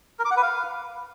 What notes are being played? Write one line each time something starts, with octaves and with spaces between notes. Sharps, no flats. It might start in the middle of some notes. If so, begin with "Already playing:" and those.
A#4
D6
F#5
B4
F5